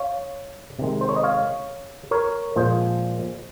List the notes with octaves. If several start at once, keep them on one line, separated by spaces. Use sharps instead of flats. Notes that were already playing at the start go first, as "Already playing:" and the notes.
Already playing: C#5 F5
C3 D#3 G#3
C5
C#5
D#5
C#5 F5
A#4 C#5
A#2 F3 G#3 G#4 C5